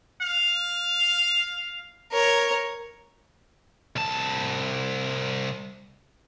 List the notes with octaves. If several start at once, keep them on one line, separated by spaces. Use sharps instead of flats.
F5
A#4 C#5
C2 A5